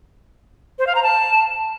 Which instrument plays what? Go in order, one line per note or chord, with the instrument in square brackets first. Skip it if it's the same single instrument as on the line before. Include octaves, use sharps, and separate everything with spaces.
[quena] C5
F5
A#5
A5